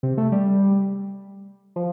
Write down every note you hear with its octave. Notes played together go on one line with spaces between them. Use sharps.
C3
A3
G3
F3